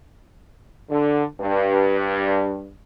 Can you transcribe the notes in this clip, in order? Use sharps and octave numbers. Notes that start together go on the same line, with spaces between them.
D3
G2